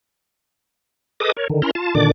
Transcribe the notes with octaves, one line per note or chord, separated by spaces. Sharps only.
G#4 A4 B4 D#5 D6 D#6
A#4 C#5
D3 D#3
C#4 E4 A#4 A#5 C6
F4 A5
A#2 D3 D#3 D4 D5 D6